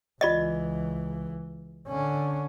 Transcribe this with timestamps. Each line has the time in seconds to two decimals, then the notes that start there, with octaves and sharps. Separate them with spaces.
0.21 C#2 E3 F4 D5 D#5
1.88 D3 C#4